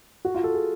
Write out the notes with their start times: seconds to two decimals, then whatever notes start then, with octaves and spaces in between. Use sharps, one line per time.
0.25 F#4
0.35 F4
0.44 A4
0.54 G#4